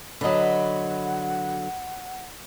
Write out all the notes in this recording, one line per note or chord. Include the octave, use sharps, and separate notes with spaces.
D3 F#3 B4 D#5 F#5